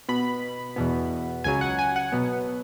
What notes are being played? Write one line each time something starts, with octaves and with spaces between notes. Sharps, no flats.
B2 B3 B5
E2 B2 B3
C#2 C#3 F#3 G#5
F#5
G#5
F#5
B2 F#3 B3